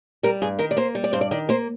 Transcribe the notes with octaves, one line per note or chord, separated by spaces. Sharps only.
G3 A#4
G2 G#4
D#3 A#4
D5
A#3 C5
G3
D5
G2 C5
D5
D#3 D5
A#3 C5